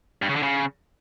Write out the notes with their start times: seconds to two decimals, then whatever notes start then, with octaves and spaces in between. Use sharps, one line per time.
0.22 G2
0.29 C#3
0.36 D3
0.43 C#3